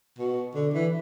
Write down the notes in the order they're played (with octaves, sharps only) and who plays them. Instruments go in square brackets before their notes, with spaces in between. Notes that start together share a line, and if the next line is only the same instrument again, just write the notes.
[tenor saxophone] B2
D3
E3